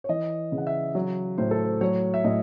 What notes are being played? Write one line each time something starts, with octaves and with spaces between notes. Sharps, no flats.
C#5
E3 D#5
C#3
F#5
E5
F#3
A2 C5
A4
C5
F#3 C#5
E5
A2 D#5